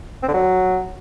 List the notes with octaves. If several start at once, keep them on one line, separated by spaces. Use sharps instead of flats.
C4
D3
F#3